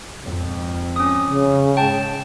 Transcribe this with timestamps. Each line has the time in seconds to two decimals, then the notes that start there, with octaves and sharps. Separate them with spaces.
0.25 F2 G#2
0.96 C#4 D#6
1.27 C#3
1.77 G#2 G5 A5